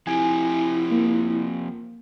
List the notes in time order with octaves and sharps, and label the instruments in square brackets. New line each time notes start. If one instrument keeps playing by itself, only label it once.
[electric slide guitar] F3 C4 G4 [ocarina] E4 [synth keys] G#5
[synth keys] A#3